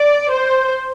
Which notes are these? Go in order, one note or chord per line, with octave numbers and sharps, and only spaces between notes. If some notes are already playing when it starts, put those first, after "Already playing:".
Already playing: D5
C5